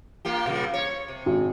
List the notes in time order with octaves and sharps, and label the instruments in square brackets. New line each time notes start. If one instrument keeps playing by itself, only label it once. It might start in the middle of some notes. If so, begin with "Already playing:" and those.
[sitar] A#3 F4 G4
A#2 C#3 G3
C#5
C3
[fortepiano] G#1